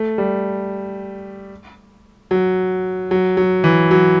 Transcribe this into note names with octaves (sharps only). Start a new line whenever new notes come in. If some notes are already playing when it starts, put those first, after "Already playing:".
Already playing: A3
G3
F#3
F#3
F#3
E3
F#3